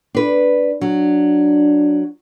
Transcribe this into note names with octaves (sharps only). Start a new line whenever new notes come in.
D4 B4
F#3 D4